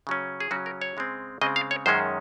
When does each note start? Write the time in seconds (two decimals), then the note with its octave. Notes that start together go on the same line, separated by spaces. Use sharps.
0.07 C#3 F#3 C#4
0.40 G#4
0.51 C#3 F#3 C#4 F#4
0.66 A#4
0.82 C#5
0.97 C#3 G#3 C4
1.41 C#3 G#3 C4 D#5
1.56 F5
1.71 C#5
1.86 F#2 D#3 G#3 C#4 C5